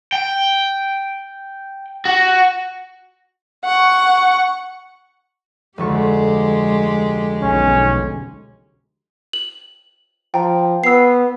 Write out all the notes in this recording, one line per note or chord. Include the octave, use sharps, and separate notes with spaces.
G5
F#4
F#5 C#6
F1 D2 G#3 G4 C#6
B1 C#4
F#7
F3 G5 A#5
B3 E6 C7